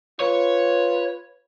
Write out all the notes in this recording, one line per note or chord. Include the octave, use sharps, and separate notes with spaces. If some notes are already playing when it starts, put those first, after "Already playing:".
F4 B4 C#5